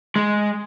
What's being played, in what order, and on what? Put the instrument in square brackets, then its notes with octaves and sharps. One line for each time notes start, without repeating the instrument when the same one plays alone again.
[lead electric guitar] G#3